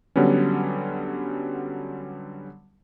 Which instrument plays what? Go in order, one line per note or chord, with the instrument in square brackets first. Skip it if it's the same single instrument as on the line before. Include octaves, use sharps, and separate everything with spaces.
[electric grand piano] D3 F#3 G3 B3 C#4